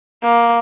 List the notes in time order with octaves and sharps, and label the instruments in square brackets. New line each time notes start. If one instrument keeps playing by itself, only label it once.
[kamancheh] A#3